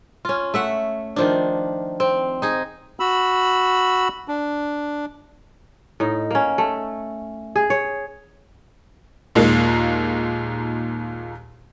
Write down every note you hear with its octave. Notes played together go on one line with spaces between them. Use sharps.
C#4 F4
A3 E5 F#5
D#3 F3 D4
C4
D#4 G#4
F#4 B5 E6
D4
A2 D#4
A#3 C#4
A3
G#4
C#5
D#2 A#2 D#3 G#3 A#3